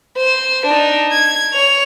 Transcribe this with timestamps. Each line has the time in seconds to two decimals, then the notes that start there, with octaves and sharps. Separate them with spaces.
0.18 C5
0.66 D4 D#4
1.13 G#6
1.53 C#5 F7